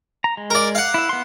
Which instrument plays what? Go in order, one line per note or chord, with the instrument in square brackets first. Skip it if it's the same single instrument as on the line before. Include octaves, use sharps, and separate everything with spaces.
[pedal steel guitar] A#5
G#3
[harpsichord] A#4 D5
F5 F#5
[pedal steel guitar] E4 E5
B3 C6